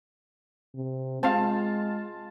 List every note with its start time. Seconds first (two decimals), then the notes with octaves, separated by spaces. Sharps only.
0.75 C3
1.23 G#3 C4 F4 F5 A5